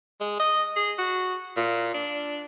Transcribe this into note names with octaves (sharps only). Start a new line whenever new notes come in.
G#3
D#5
G#4
F#4
A#2
D4